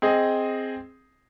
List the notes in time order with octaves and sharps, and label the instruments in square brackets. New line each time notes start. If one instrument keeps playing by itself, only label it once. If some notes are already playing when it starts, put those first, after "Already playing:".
[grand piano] C4 G#4 D#5